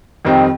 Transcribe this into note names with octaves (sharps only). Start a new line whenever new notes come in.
F2 D#3 G3 C4 D#4